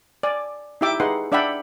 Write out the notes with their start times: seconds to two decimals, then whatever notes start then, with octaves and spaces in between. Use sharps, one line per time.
0.23 D5 G#5
0.81 D#4 E4 G4 E5 G5 D6
1.00 D#4 G#4 B4 F#5 C6
1.32 D4 D5 E5 F#5 G5 B5